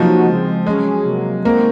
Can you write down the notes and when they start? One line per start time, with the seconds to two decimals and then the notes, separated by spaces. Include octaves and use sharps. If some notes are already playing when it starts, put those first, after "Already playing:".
Already playing: C3 F3 F#3 A#3 D#4 F#4
0.27 C#3 G#3 C4
0.65 F#3 G#3 C#4 G#4
1.05 C3 F#3 A#3
1.45 D#3 G#3 A#3 C4 F#4 C5